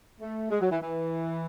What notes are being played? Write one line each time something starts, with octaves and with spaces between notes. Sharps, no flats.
A3
G#3
F#3
E3
E3